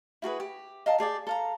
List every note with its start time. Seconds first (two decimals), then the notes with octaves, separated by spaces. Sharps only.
0.22 E4 F#4 G#4 B4
0.40 G4
0.86 D#5 F5 A5 A#5
0.98 G4 G#4 D5 G5
1.27 A4 F5 A#5